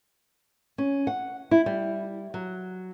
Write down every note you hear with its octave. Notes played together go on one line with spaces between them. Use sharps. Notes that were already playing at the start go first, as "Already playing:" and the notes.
C#4
F#5
E4
G3
F#3